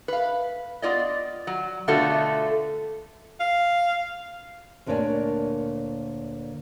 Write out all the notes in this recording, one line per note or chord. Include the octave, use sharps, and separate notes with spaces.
B4 F5
B3 F4 D5 D#5
F#3
B2 D3 A3 F4 F#4 A4
F5
D2 A#2 D4 A#4 C#5 G#5